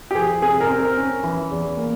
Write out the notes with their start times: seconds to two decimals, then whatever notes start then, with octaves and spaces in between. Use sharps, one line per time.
0.11 G4
0.15 F3 G#4
0.42 C3 G#4
0.60 A#4
0.69 C4
0.79 A#4
0.97 C#4
1.24 E3
1.51 E2
1.77 A#3